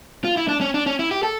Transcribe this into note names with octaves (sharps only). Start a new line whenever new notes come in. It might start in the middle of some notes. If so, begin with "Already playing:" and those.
F4
E4
D4
C#4
D4
C#4
E4
G4
A4